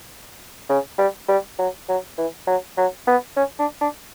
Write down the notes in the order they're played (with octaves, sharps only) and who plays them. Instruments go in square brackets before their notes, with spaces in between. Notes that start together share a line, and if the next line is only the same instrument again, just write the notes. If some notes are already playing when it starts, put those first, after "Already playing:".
[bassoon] C#3
G3
G3
F#3
F#3
E3
F#3
F#3
B3
C#4
D4
D4